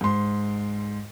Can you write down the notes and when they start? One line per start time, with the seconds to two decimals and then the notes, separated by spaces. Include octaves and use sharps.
0.01 G#2 C6